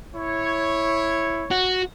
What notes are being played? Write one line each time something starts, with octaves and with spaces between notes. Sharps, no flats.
E4 C#5
F#4